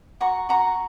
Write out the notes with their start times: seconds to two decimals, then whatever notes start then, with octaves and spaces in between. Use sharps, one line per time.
0.20 F#4 A#5 C#6
0.49 F#4 A#5 C#6